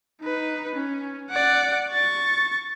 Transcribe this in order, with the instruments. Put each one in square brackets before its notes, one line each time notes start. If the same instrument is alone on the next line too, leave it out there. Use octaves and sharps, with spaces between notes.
[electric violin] D#4 B4
C#4
D5 F#5
C#6 A6